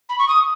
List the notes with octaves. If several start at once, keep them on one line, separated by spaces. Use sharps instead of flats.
B5
C#6
D#6